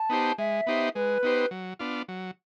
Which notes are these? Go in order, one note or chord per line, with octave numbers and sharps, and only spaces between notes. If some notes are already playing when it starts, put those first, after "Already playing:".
Already playing: A5
B3 D#4 G4 C5
G#3 E5
B3 D#4 G4 C5
G#3 B4
B3 D#4 G4 C5
F#3
B3 D4 F4
F#3